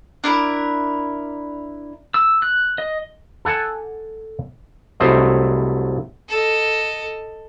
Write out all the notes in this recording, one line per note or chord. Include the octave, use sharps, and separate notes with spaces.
D4 E4 A#4
E6
F#6
D#5
A4 F#5 G#5 A5
C2 F#3 A3 C5 D#5
A4 D#5